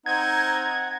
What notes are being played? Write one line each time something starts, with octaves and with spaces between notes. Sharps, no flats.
C4 D#4 F#5 A#5 F#6 G#6